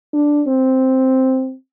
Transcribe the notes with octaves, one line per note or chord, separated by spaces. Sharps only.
D4
C4